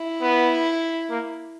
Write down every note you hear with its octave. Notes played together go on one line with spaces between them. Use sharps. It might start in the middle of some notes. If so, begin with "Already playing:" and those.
Already playing: E4
B3
A#3